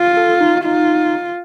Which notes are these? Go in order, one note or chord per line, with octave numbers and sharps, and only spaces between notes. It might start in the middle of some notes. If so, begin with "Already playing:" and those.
Already playing: F4
A4
D#4
D#4 F4